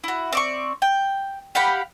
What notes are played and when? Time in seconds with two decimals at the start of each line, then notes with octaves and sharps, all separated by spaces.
0.04 E4 F#4
0.33 C4 D5 C#6
0.82 G5
1.55 G4 F5 F#5 B5